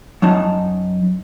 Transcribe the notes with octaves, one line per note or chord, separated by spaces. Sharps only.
F#2 F#3 D#4 A5